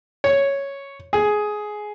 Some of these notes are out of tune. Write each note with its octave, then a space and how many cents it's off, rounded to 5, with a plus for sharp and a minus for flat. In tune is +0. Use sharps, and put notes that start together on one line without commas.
C#5 +0
G#4 +10